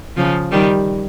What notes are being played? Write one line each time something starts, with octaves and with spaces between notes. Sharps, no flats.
C#3 F3
D#3 G3